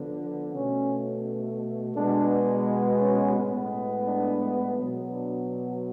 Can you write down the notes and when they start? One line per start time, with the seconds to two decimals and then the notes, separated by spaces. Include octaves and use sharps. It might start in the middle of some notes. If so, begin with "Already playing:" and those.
Already playing: D3 F3 B3
0.54 B2 A3 C#4
1.95 B2 G#3 B3 D4
3.01 C#4
3.37 A2 G#3 B3
4.07 D4
4.78 B2 F#3 B3
5.12 D4